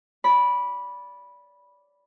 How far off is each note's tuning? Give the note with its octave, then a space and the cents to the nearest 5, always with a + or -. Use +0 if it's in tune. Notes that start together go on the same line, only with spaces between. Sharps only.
D5 -20 B5 -10